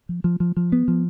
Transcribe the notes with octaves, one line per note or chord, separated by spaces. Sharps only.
F3
F3
F3
F3
B3
F3